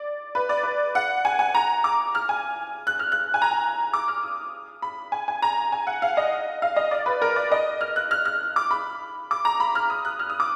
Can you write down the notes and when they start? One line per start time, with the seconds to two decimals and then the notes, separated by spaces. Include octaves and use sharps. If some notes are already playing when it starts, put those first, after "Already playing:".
Already playing: D5
0.35 B4
0.49 D5
0.63 B4
0.95 F#5
1.25 G#5
1.39 G#5
1.55 A#5
1.84 D6
2.15 F6
2.29 G#5
2.87 F#6
2.99 F6
3.12 F#6
3.34 G#5
3.42 A#5
3.51 G#5
3.94 D6
4.08 F6
4.23 D#6
4.82 B5
5.12 G#5
5.28 G#5
5.42 A#5
5.72 G#5
5.87 F#5
6.02 F5
6.17 D#5
6.62 F5
6.76 D#5
6.91 D5
7.06 B4
7.22 A#4
7.36 D5
7.52 D#5
7.81 F6
7.96 F#6
8.11 F6
8.25 F6
8.56 D6
8.71 B5
9.31 D6
9.45 A#5
9.60 B5
9.75 F6
9.90 D#6
10.05 F#6
10.19 F6
10.30 D#6
10.40 D6